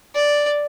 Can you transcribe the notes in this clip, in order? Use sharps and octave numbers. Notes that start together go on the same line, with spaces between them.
D5